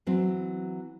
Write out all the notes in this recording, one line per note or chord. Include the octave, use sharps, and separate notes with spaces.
E3 F#3 C4